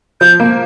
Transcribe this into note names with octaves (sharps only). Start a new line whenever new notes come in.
F3 G6
A#3